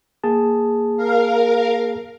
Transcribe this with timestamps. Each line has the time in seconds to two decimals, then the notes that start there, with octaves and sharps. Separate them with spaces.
0.24 A#3 G#4 A5
0.96 A#4 F5